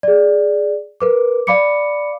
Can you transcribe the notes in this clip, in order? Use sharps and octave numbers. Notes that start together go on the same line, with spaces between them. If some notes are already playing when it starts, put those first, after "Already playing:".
G#4 D5
A#4 B4 D6
D5 F5 B5 D6 C#7